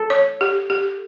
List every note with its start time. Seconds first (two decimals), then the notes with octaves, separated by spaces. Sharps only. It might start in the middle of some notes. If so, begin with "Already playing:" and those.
Already playing: A4
0.10 C#5
0.41 G4
0.70 G4